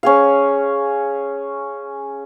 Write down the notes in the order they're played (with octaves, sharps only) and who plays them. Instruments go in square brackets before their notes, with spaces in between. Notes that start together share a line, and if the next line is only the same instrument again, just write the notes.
[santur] C#4 G#4 F5